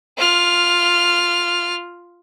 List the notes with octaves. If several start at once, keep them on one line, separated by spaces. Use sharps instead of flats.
F4 F6